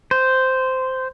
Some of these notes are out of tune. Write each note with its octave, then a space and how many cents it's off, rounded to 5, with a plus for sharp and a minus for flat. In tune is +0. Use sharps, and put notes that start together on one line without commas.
C5 -10